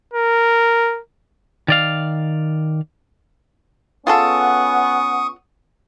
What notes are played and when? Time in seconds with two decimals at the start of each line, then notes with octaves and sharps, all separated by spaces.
0.14 A#4
1.68 D#3 D5 F5
4.07 B3 C#4 F4 G#4 A4 F#5 C#6 D#6